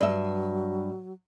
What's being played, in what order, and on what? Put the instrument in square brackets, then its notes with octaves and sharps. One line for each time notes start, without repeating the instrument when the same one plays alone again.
[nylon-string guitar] G2 E5 [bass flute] F#3 [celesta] D5